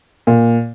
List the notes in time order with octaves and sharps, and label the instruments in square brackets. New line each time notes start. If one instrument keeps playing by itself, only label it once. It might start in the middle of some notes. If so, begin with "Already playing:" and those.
[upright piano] A#2